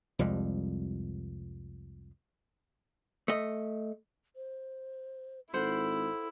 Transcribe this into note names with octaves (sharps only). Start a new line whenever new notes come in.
C2 F2 G3 G#3
A3 D#5
C5
G#1 E4 A4 C5 F#5